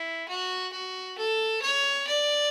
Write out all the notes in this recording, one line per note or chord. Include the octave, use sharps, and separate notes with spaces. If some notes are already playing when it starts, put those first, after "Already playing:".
Already playing: E4
F#4
F#4
A4
C#5
D5